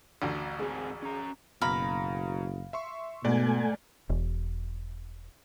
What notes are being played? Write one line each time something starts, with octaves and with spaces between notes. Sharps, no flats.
A1 D2 D3
G#2 C4 G#4 G#5
C#4 A#5
F#1 B2 F5 A#5 B5 A#6
E5 C6 C#6
G#2 B2 A3 D5 F#5 G#5
E1